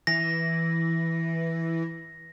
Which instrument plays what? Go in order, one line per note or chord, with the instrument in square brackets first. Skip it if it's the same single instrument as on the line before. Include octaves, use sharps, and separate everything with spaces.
[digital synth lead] E3 [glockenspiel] A#6